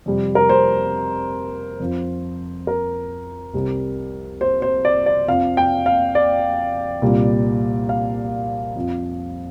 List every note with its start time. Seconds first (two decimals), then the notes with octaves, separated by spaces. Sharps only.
0.06 F2 C3 G3
0.35 A#4
0.49 C5
1.80 F2 F3
2.67 A#4
3.53 C2 C3 G3
4.41 C5
4.62 C5
4.85 D5
5.06 D5
5.28 F2 F3 F5
5.57 G5
5.86 F5
6.15 D5
7.02 C2 A#2 G3
7.89 F5
8.76 F2 F3